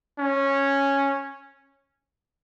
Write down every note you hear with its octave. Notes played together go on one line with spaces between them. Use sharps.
C#4